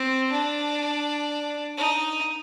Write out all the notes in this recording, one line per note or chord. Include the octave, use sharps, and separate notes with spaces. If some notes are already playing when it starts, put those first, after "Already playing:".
Already playing: C4
D4
D#4